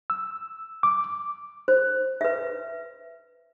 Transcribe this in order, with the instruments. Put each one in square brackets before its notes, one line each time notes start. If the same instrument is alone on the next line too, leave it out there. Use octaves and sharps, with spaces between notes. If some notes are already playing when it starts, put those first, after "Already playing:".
[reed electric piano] E6
D6
[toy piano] C5
B4 E5